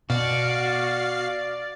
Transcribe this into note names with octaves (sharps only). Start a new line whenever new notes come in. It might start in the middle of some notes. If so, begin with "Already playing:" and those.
B2 F#4 D5 F5